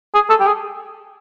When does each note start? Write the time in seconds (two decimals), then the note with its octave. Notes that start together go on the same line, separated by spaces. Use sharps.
0.15 G#4
0.30 A4
0.40 G4
0.47 G#4